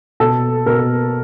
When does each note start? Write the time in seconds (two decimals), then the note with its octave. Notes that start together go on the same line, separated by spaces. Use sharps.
0.20 B2 A4
0.66 B2 A#4